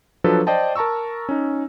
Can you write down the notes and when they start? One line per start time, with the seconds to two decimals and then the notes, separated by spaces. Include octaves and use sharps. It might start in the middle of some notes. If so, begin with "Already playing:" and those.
0.24 F3 F#3 D4 F#4 A4 B4
0.47 C5 D5 D#5 G5 A5
0.76 A#4 A5 A#5 C#6 E6
1.29 C#4 D#4